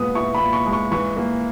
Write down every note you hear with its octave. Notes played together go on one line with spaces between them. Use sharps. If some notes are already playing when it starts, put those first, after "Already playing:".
Already playing: A#2 G#3 B3 D#6
E4 C#6
B5
A#2
C#6
G#3
C#6
E3 C#6
A#3